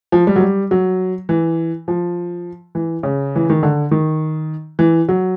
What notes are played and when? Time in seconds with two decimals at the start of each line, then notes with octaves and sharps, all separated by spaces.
0.12 F3
0.27 G3
0.36 F#3
0.41 G3
0.71 F#3
1.29 E3
1.88 F3
2.75 E3
3.03 C#3
3.36 E3
3.50 D#3
3.63 D3
3.91 D#3
4.79 E3
5.09 F#3